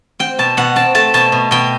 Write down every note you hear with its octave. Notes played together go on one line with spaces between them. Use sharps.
C4 G5
B2 A5
B2 F#5
C4 A5
A3 A5
B2 A5
B2
B2 G5